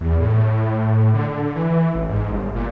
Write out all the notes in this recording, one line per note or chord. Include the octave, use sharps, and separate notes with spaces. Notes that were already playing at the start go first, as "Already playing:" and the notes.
E2
A2
D3
E3
A1
G#2
G1
A#2